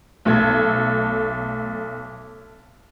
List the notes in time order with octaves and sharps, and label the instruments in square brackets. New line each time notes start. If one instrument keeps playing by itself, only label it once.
[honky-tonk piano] B1 A3 A4 G#6